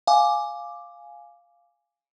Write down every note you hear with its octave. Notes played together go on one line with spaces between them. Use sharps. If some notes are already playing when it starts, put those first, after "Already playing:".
F5 G#5 D6